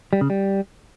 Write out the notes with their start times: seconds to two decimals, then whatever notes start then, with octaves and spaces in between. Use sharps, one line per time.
0.13 G3
0.21 C#3
0.30 G3